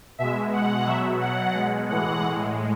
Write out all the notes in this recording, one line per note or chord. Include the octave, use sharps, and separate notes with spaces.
B2 G#3 E5
B2 G#3 F#5
B2 F#3 E5
B2 F#3 F#5
B2 G#3
A2 E3 G#3 F#5
A2 G#3